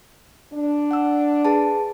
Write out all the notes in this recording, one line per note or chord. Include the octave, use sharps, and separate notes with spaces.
D4
F#5 E6
G#4 B4 A5